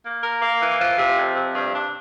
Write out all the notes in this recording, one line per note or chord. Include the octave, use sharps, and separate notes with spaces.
A#3
A#4
A#3
E3
F3
C3
F2
C3
G2
D4